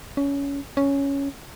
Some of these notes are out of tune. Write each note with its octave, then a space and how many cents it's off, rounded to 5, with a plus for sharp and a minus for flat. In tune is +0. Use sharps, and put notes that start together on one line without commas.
C#4 +20
C#4 +5